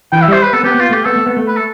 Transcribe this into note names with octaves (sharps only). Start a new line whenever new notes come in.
E3 G5
E5
G3 C5
B4
B3 A4
B3 G4
B3
F4
A3 G4
B3 A4
A3
B3
A3
B4
A4